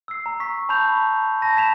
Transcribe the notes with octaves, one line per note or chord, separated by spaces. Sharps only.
E6 C7
A#5
C#6 B6
A5 B5 C#6 G6 F7
A5 B5 A#6
G#6 B6 E7 F7